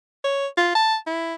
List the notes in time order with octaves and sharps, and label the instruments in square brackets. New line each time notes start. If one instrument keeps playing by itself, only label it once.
[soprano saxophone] C#5
F4
A5
E4